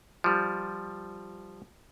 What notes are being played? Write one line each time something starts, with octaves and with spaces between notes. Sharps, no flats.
F3 G3